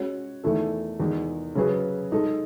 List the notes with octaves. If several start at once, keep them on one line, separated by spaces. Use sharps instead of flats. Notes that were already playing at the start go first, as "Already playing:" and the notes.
Already playing: G#3 C#4 F#4 C#5
E2 D#3 A3 E4 A4
E2 D#3 G#3 D#4
C#3 F#3 C#4 G#4 B4
G#3 D#4 A4